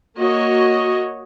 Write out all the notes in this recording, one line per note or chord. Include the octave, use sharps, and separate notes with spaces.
A#3 F#4 C#5 D#5